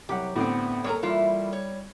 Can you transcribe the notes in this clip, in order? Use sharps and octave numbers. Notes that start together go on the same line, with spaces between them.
C2 F#3 G4 F#5
A2 D3 B3 C4
G3 A#3 A4 A#4 C#5 A#5
E3 G3 E4 F4
C#5